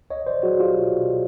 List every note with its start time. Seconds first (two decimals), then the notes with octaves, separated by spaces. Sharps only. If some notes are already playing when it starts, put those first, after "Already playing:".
0.10 C#2 C#5 D#5
0.27 C5 D5
0.43 F#3 F#4 G#4
0.60 F4 G4
0.77 B2